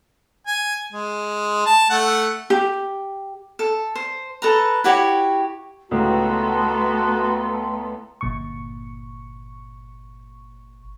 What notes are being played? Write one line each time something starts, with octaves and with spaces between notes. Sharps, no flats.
G#5
G#3
A5
A3 F#5
G4
A4
C5
A4 B4 A#5
E4 F#4 G4 C#5
C#2 A2 A3 B3 F#4 A4 A#5 C6
G1 A#2 C#6